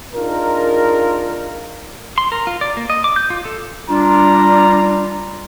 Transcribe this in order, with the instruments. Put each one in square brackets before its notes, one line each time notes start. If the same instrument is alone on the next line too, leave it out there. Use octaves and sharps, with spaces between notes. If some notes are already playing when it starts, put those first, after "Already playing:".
[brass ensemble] D4 D#4 F4 G#4 A#4
[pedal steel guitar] C6
A#4
F4
D5
A#3
D#5
D6
G6
F4
A4
[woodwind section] G3 F4 [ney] D4 [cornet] A#5